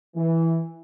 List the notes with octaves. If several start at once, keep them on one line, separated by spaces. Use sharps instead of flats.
E3